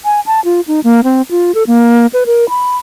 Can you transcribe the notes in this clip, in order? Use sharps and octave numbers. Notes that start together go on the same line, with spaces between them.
G#5
A5
F4
D#4
A#3
C4
F4
A4
A#3
B4
A#4
B5